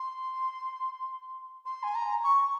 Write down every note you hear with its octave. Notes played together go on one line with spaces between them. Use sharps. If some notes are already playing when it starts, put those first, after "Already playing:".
Already playing: C6
C6
G#5
A#5
C#6